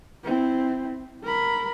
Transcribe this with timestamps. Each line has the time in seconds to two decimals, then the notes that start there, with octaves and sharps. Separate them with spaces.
0.24 C4 E4
1.23 A#4 B5